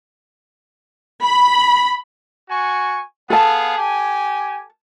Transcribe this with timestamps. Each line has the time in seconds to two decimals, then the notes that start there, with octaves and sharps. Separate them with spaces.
1.24 B5
2.50 F#4 G#5 C#6
3.30 B3 G#4 A4 F5 A5
3.78 G4 G#5